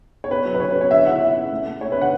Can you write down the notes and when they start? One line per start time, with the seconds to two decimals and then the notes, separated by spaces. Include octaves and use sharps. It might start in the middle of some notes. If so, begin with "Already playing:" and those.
0.24 C#5
0.30 B3 B4
0.45 F#3
0.54 B4
0.60 C#3 C#5
0.71 B4
0.76 B3
0.81 C#5
0.91 D3 E5
1.05 E4 F#5
1.21 E4 E5
1.36 C#4
1.52 A3
1.66 A3
1.81 A3 C#5
1.92 B4
1.97 D3 F#5